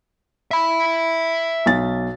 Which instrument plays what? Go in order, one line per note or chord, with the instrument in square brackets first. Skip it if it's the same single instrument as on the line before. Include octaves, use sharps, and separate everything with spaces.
[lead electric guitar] E5 B5
[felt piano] B1 A6